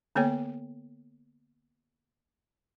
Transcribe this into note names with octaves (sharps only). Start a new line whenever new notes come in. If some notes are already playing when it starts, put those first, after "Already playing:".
D3 A#3 B3 A4 C#5 G5